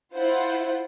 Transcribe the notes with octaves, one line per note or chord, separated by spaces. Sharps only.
E4 F4 C5 F#5